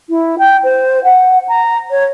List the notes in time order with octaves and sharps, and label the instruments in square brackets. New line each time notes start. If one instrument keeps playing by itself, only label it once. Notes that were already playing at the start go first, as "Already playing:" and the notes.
[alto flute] E4
G5
C5
F#5
A#5
C#5